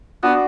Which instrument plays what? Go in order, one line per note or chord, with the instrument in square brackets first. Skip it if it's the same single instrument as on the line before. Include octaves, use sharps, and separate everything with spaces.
[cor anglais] B3 [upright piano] D4 F#4